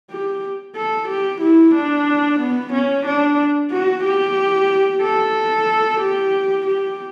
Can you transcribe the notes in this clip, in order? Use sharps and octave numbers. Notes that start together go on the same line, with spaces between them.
G4
A4
G4
E4
D4
B3
C#4
D4
F#4
G4
A4
G4
G4